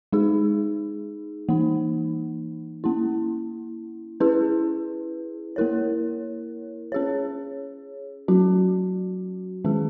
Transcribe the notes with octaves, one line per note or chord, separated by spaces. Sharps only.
G#3 D#4 G#4
E3 A#3 D#4
A#3 C#4 E4
C#4 E4 G#4 B4
A#3 E4 A#4 C#5
C#4 G#4 C#5
F#3 C#4 F#4
D#3 G#3 C#4 G#4